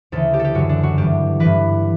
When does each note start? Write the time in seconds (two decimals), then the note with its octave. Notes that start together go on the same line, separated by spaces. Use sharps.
0.12 D2 C#3 E3 A4
0.34 G4
0.39 A4
0.44 G4
0.54 F#2 D3 F#4
0.69 D4
0.83 F#4
0.98 G2 E3 G4
1.40 G2 E3 B4